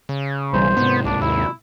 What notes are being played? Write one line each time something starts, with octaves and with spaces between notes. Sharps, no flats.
C#3
B1 E3 G3 C5
G#2 C3 B3
C2 D4
D#2 E4